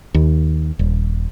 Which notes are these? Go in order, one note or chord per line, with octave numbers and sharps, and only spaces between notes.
D#2
D#1